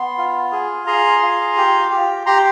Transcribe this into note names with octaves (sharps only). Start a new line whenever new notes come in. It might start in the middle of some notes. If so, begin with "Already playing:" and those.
Already playing: B3 C6
F4
G#4
G#4 A#5 C6
F4
G4
G4
G4 A#5 C6